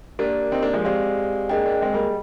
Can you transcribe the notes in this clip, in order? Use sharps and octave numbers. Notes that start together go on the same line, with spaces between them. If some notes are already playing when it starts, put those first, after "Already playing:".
A#3 D4 G4 A#4 D5
C4 D#4
A#3 D4
F3 G#3
G#3 C4 G4 D5 F5
A#3 D4 G#4 D#5 G5
A#3 D4
G#3 C4
G3 A#3
G3